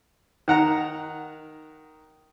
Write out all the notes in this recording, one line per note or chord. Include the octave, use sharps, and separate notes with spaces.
D#3 F#5 A#5